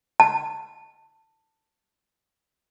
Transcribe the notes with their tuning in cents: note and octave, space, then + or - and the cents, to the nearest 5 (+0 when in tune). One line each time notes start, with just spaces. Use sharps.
A5 +15